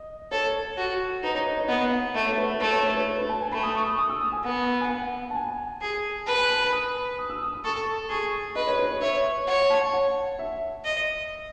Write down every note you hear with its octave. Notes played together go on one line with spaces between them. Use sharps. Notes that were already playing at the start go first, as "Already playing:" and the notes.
Already playing: D#5
A4 C#5
F#4
D#4 B4
C#5
D#5
C#5
B3 D#5
F#5
A3 E5
C#5
B4
E5
A3 C#5
C#5
C#5
B4
B4
A5
G#5
A3 B5
D#6
C#6
D#6
D#6
E6
D#6
G#5
B3 F#5
G#5
F#5
A5
G#5
G#4
B4 A5
G#5
A5
B5
D#6
D#6
E6
D#6
D#6
A4 C#6
G#4 C#6
B4 D#5
C#5
B4
C#5
C#5 E5
C#5 F#5
A5
F#5
E5
D#5